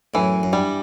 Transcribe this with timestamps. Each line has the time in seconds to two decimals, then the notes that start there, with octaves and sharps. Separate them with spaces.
0.14 F#2 A2 E3
0.43 F#2
0.53 G2 G3